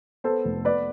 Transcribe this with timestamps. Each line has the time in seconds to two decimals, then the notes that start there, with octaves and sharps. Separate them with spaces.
0.24 B3 A4 C5
0.45 F1
0.65 B3 B4 D5